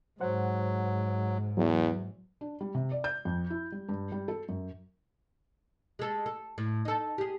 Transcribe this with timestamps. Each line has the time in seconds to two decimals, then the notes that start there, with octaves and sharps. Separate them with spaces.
0.21 G#2 F#3 C5 F#5
1.57 E2 F#3
2.41 D4
2.61 G3
2.75 C3
2.91 D5
3.04 G6
3.25 F2
3.50 E4
3.72 G3
3.89 G2
4.12 G3
4.28 A4
4.49 F#2
5.99 G#3 A4
6.26 A4
6.58 A2
6.85 D#4 A4
7.18 G4 G#4